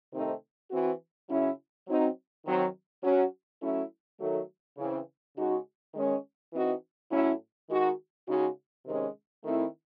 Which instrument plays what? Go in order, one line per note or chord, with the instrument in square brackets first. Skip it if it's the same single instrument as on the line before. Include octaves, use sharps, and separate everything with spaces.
[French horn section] C3 D#3 A3 C4 D#4
E3 C4 F#4
C#3 F#3 C#4 E4
F#3 C4 D#4
D#3 F#3 C4
F#3 C#4 F#4
F#3 A3 C#4 E4
D#3 F#3 A3
C#3 E3 C4
C#3 G#3 D#4 F#4
D#3 G#3 C#4
E3 C4 D#4 F#4
A2 F#3 C#4 E4
D#3 G#3 D#4 F#4
C#3 G#3 D#4 F#4
C3 D#3 G#3 C#4
D#3 A3 C4 E4